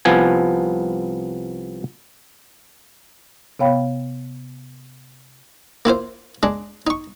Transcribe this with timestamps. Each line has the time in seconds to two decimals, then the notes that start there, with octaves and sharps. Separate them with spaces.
0.05 C2 F3 B3 G#5
3.59 C3 B3 C#5 F5 G5 B5
5.85 A#3 E4 F4 C5
6.43 G#3 D4
6.87 D#4 C#6